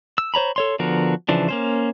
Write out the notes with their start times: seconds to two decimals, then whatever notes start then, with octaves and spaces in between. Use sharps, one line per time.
0.18 E6
0.34 C5 C#5 A#5 B5
0.56 A4 C#5 C6
0.79 D3 F3 B3 F#4 A#4
1.29 C#3 E3 F3 D4
1.49 A#3 C#4 C5